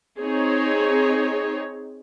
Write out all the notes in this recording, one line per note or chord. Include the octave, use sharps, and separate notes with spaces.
C4 D#4 G#4 C#5